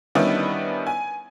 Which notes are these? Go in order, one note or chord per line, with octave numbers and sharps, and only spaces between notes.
D#3 G3 B3 C#4 D4 E4
G#5